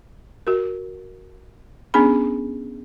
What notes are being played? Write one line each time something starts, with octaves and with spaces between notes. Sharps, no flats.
F#4 A#4
B3 C#4 D4 G#4 B5